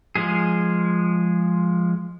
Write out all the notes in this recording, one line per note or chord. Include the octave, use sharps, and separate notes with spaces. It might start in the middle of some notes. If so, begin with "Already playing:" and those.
F3 G#3 G#4